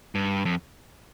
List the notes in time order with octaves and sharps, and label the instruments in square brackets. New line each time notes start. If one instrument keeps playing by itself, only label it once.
[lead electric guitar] G2
F2